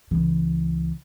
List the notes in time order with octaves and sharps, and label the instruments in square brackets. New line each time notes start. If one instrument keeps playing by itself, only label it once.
[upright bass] C#2 E3